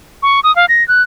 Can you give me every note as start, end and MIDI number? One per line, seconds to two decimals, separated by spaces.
0.23 0.40 85
0.44 0.54 87
0.56 0.66 77
0.69 0.86 94
0.88 1.02 90